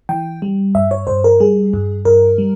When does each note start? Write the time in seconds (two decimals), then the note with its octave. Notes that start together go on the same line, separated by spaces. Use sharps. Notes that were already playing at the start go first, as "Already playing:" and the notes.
0.09 E3 G5
0.42 G3
0.75 G2 E5
0.91 C#5
1.07 G2 C5
1.24 A#4
1.40 G3 G#4
1.73 G2
2.05 G2 A#4
2.38 G3